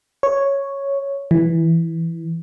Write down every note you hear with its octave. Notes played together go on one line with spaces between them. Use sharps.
C#5
E3